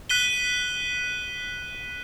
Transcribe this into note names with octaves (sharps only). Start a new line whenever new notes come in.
F#6 B6 D#7 G7